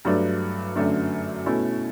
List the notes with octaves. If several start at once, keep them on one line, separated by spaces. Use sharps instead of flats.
G2 F#3 A3 D4
F#2 D3 F#3 A3 D4
B2 A3 C#4 E4